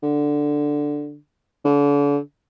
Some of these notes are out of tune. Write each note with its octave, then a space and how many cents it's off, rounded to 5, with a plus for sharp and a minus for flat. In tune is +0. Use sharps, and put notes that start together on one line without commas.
D3 +0
D3 -40